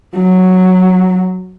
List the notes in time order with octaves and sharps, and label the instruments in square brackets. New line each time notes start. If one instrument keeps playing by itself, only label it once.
[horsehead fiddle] F#3